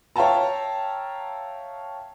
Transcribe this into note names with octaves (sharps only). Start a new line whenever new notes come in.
C#5 E5 F5 G5 A5 A#5